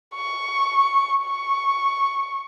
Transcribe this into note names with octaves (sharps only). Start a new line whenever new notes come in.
C#6
C#6